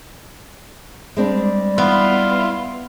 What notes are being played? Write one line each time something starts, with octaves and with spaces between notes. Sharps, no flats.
G3 G#3 C4 D4
B3 E4 F5 C6